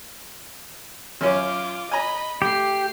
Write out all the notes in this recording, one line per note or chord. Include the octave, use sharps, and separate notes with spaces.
F#2 C#4 F4 D6
D#5 G#5 A#5 B5
A3 G4 C7